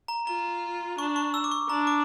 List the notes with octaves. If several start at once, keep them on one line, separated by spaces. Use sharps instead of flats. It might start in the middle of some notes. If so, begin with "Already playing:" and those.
A#5
F4 A#5
D4 C#6
C#6
E6
D6
C#6
D4 A#5
D6